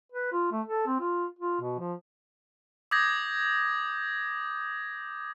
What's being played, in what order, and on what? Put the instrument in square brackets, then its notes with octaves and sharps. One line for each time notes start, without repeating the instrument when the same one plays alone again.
[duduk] B4
F4
A3
A4
C4
F4
F4
B2
F3
[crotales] D6 D#6 G6 G#6 A#6